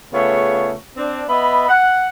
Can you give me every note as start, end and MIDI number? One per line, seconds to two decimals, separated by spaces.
0.13 0.72 49
0.13 0.72 57
0.13 0.72 59
0.13 0.72 65
0.13 0.72 68
0.13 0.72 73
0.97 1.23 60
0.97 1.23 62
1.29 1.67 59
1.29 1.67 75
1.29 1.67 76
1.29 1.67 83
1.69 2.08 78